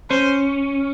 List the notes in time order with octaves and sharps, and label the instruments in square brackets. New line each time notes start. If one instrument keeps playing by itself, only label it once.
[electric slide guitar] C#4 [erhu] C5